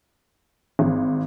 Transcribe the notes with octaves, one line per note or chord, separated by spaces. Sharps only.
G#1